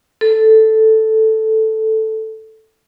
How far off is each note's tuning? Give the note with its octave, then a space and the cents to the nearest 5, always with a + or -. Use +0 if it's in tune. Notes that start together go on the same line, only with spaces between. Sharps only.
A4 +0